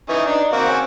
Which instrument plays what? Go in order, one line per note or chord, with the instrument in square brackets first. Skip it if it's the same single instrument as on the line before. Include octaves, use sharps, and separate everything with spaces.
[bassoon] E3 [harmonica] C#4 D#4
[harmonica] D4 [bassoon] D#4
[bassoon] A#3 [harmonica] C4 F#4
[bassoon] C#4